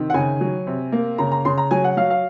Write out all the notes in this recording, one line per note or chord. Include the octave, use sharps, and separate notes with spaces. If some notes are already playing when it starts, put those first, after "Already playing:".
Already playing: C3 D#3
F#5
C#3 G#5
F#3
C3
A#3
C#3 A#5
A#5
C#3 C6
A#5
F#3 G#5
F#5
F#3 F5
F5